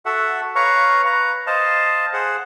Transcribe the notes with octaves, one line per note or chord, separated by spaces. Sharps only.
F#4 A4 E5 F#5
B4 C#5 F5 A#5 C#6
B4 A#5
C5 D#5 F5 A5
G#4 C5 F#5